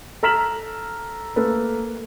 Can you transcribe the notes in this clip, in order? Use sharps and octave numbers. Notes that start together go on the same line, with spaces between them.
A4 A#5 F6 B6 E7 F#7
A3 A#3 A4 B4